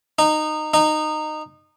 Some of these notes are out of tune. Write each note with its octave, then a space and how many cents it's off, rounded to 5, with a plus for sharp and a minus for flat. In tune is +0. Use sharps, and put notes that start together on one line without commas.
D#4 -20
D#4 -20